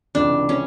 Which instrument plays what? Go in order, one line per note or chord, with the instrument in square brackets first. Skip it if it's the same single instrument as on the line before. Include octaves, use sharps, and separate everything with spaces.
[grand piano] C#2 C3 E3 [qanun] D4
[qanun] C#4